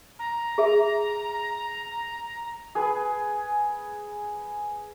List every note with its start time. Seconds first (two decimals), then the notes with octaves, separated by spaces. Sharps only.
0.19 A#5
0.58 G#4 E5
2.75 G#4 B4